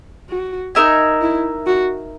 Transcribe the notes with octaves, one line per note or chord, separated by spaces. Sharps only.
F#4
D#4 A#4 E5 G#5
E4
F#4